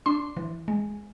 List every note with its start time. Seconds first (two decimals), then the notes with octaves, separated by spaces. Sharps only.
0.06 D4 C6
0.37 E3
0.68 G#3